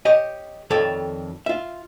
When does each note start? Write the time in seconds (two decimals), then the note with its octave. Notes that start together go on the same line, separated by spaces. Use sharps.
0.05 G4 C#5 D#5
0.70 F2 D#3 A4 C#5 D5
1.46 F4 E5